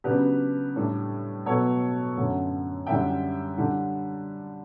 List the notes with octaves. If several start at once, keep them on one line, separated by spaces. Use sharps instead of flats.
C#3 F#3 B3 D4 G4 B4
A2 G3 D4
B2 F#3 B3 A4 C#5
F#2 D3 F#3 A3 C#4
F#2 D3 G3 E5 G5
D3 G3 D4